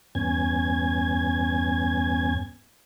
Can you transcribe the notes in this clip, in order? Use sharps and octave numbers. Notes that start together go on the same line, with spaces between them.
E2 G2 B3 C#4 G#5 G#6